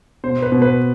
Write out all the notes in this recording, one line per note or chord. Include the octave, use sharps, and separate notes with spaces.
B2 C5
B4
B2
B4